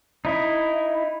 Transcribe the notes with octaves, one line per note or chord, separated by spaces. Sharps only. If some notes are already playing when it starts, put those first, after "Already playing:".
D#4 E4